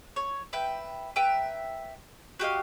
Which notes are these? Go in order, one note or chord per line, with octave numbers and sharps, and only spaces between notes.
C#5
B4 E5 G5
B4 E5 G5 A#5
F#4 G4 D#5 F5